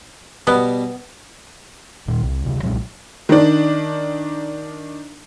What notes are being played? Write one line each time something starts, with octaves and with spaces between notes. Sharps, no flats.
B2 G3 B3 D6
A#2 D#3 G3
C2
D2 C3
B1 A#2 F#3 G#3
D#3 D4